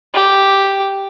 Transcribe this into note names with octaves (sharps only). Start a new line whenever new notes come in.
G4